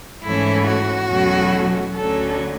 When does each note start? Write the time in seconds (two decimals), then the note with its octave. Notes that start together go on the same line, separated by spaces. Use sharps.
0.23 G#2 E3 A3 C#4 E4
0.66 F#4
1.09 E2 B2 F#3 A3 C#4
1.95 D2 D3 F#3 C#4 A4